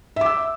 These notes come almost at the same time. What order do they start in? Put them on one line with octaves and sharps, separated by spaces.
E5 D6 E6